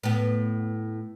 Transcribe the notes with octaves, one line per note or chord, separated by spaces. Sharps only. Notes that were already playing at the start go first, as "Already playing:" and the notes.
A2 B3